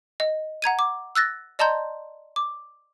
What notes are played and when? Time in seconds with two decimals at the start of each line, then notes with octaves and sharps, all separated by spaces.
0.20 D#5
0.62 F#5 A#5 G#6 D#7
0.79 D6
1.15 E6 F#6 A6 A#6
1.59 D5 D#5 A5 A#5 C6 G6
2.36 D6